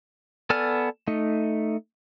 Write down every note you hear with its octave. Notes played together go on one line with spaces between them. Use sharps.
B3 A4 D5 G#5 F6
A3 D#4